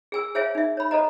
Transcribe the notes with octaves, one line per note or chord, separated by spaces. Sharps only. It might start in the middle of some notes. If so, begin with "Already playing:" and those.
G#4 G#5 E6
G#4 C5 C#5 E5 F5 G#5
D#4 E5
C#5 B5
A4 C5 D#5 A#5